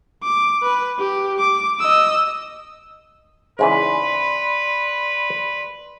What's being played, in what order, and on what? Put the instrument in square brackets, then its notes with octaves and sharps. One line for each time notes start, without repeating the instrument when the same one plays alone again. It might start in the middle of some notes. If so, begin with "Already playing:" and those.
[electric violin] D6
B4
G4
D6
D#5 E6
[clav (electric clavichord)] G#2 C#3 E3 [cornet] B4 [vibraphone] D5 B5 C6